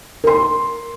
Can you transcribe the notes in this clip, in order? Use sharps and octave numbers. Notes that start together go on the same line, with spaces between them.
A#4 C6